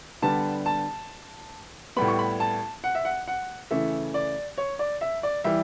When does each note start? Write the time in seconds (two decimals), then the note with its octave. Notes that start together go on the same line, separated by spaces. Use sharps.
0.22 D3 G3 B3 A5
0.66 A5
1.96 A2 G3 B3 B5
2.08 C#6
2.19 B5
2.40 A5
2.84 F#5
2.95 E5
3.05 F#5
3.28 F#5
3.71 C#3 E3 A3 E5
4.14 D5
4.58 C#5
4.79 D5
5.01 E5
5.23 D5
5.44 E3 G3 E5